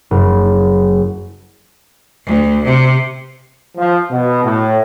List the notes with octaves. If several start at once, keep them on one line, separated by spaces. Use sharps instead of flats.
F#1
D2
C3
F3
B2
A2